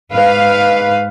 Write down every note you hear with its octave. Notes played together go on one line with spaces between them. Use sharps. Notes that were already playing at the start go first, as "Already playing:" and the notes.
G#2 B4 F5